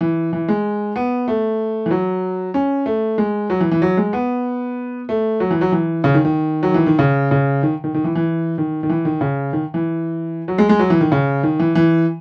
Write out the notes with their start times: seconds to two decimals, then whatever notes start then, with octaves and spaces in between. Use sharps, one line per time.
0.01 E3
0.33 E3
0.48 G#3
0.96 B3
1.28 A3
1.86 E3
1.91 F#3
2.54 C#4
2.86 A3
3.18 G#3
3.50 F#3
3.60 E3
3.71 E3
3.82 F#3
3.97 G#3
4.13 B3
5.09 A3
5.40 F#3
5.51 E3
5.61 F#3
5.72 E3
6.04 C#3
6.14 D#3
6.25 D#3
6.63 F#3
6.74 E3
6.86 D#3
6.99 C#3
7.31 C#3
7.63 D#3
7.84 D#3
7.94 D#3
8.04 E3
8.15 E3
8.58 D#3
8.83 D#3
8.89 E3
9.05 D#3
9.21 C#3
9.53 D#3
9.74 E3
10.48 F#3
10.58 G#3
10.69 G#3
10.79 F#3
10.90 E3
11.01 D#3
11.12 C#3
11.43 D#3
11.59 E3
11.75 E3